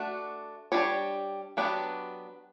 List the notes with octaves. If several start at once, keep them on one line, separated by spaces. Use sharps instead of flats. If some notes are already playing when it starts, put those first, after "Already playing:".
Already playing: A3 D4 F#4
G3 D4 G4 C#5
F#3 B3 D4 G4 B4